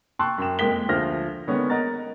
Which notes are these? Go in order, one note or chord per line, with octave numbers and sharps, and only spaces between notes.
G5 A5 C6 C#6 E6 F#6
F#2 G5 E7
F2 G#3 A#3 G5 B6 G7
D2 F3 C5 F6 A#6
D3 D#3 G#3 B3 C#4
A#4 D#5 F#5 A#5 A6